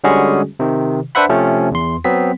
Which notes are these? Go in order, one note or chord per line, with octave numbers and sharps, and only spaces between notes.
D3 G3 G#3 C#4 F#4 G#4
C3 D#3
D4 B4 C5 E5 F#5 B5
C3 F3 A3 C4 C#4
E2 C6
F#3 B3 C4 B6